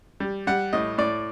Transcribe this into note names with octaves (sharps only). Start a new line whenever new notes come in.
G3
G3 F#5
A2 D#5
A2 D5